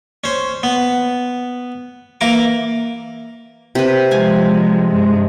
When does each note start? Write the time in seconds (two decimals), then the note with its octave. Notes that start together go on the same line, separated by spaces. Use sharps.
0.24 C#4 C5
0.63 B3
2.21 E3 A#3 A#5 D6
3.75 C3 B4
4.11 F3 G#3 F5 G#5
4.88 G2 G#3